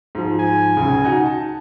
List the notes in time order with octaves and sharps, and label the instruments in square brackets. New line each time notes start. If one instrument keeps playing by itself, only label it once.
[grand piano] G#2 F3
[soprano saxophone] G#5
[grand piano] C#2 C#3
D#4 F#4
A5